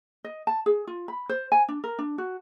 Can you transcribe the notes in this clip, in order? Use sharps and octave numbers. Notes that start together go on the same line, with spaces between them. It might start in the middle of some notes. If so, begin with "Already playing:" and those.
D#5
A5
G#4
F4
B5
C5
G#5
D4
A#4
D4
F#4